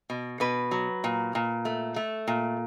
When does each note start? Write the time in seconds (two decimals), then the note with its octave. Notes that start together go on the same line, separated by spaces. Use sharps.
0.10 B2
0.40 B2 B4
0.71 F#3
1.04 A#2
1.35 A#2
1.65 A3
1.96 A3
2.28 A#2